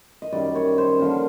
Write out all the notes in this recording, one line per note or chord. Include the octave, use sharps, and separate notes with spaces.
D#5
F#2 D#3 G3 D5
C#5
C5
D3 F3 A#3 C#4